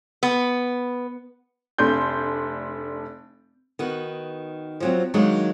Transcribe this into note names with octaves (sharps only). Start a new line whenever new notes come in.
B3
F1 A3 D4 C6 G6
D#3 B3 F#4
F3 F#3 C4
D#3 F#3 G#3 A#3 D4 D#4